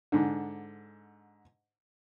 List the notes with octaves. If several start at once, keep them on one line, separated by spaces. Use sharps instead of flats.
G#2 D3